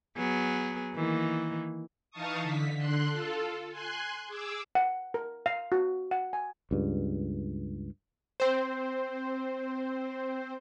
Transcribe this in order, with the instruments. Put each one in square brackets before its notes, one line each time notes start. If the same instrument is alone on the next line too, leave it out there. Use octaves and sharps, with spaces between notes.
[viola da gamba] F#3 B3 G#4
D#3 E3 A#3
[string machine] E3 D#4 F5 A5 C#6 D#6
D3 B6
D3 C6 F#6
F4 A4
G#5 C6 F#6
G#4 D6 E6
[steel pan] F#5
A#4
F5
F#4
F#5
G#5
[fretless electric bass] C#2 G2
[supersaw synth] C4 C5